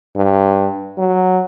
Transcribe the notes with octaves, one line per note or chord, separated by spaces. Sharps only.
G2
F#3